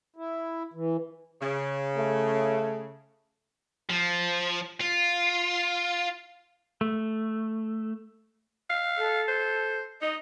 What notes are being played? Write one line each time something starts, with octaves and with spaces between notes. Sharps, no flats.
E4
E3
C#3
A3
F3
F4
A3
F5
A4
C5
D#4 D#5